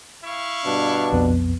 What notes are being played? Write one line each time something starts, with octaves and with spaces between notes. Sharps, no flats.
E4 F5 C#6
G2 B2 D4
B1 F2 B3